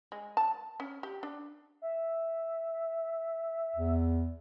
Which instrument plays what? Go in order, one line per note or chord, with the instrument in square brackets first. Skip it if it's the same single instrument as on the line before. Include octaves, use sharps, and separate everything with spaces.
[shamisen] G#3
A5
C#4
G4
D4
[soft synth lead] E5
[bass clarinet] E2